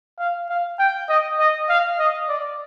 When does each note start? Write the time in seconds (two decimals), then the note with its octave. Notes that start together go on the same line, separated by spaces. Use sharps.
0.19 F5
0.49 F5
0.79 G5
1.09 D#5
1.39 D#5
1.69 F5
1.99 D#5
2.29 D5